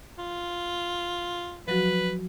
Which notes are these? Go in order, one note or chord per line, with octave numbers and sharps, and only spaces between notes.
F4
F3 F#3 F#4 B4